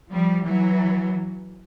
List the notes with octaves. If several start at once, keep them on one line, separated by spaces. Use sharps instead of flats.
F3 G3
E3 F#3